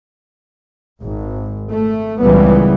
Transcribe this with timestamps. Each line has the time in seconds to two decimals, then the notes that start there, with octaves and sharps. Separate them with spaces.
1.03 G#1
1.72 A3
2.22 C#2 A#2 C#3 E3 G3 B3